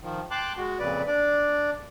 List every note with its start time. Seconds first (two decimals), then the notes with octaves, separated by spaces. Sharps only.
0.02 D#3 F3
0.31 G5 A5 C6 D6 F#6
0.57 G#3 F#4
0.79 F2 A#2 C#3 B4 D5
1.07 D4 D5